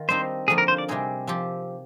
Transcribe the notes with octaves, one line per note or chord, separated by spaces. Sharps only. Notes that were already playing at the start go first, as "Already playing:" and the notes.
Already playing: D#3 F4
G3 C4 D#4 C5
D3 F3 A#3 G#4
A#4
C5
D5
C3 G3 C4 D#4 G#4
F3 C4 G4